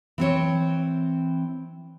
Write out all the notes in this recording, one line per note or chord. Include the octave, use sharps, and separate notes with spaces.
E3 C4 C#5